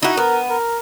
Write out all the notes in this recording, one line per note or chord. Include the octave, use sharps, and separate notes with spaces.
D#4 E4 F#4
B3 A#4
A#4